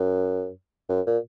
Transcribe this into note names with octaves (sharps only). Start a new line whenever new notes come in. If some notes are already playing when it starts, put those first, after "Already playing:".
Already playing: F#2
F#2
A#2